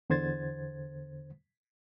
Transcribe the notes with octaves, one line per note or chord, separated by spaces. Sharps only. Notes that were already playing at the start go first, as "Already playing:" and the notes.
E2 D3 C5 G#6 A6